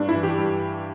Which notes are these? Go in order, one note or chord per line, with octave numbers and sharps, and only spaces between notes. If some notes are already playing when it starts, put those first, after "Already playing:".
Already playing: G2 D4
E4
E3
G4
G2